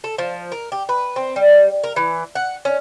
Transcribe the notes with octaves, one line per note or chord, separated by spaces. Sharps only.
A4
F3
A#4
G4
B4
C4
G3
A#4
E3
F#5
C#4